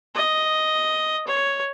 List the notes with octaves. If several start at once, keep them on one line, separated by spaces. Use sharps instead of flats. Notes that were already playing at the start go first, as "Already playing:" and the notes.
D#5
C#5